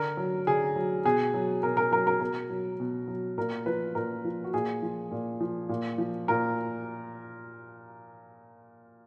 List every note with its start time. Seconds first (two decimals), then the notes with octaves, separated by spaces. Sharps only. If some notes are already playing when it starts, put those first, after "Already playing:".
Already playing: D3 A#4
0.17 F#3
0.47 D3 G#4
0.76 F#3
1.05 B2 G#4
1.34 F#3
1.63 B2 A#4
1.77 A#4
1.91 F#3 A#4
2.07 A#4
2.21 B2 A#4
2.50 F#3
2.80 B2
3.08 F#3
3.38 A#2 A#4
3.66 F3 B4
3.95 A#2 A#4
4.25 F3
4.44 F#4
4.54 A#2 G#4
4.82 F3
5.11 A#2
5.40 F3
5.69 A#2
5.98 F3
6.28 A#2 A#4